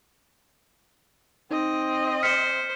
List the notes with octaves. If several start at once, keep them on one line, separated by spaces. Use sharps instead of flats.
C4 D#4 D#5
C5 F6 B6 C#7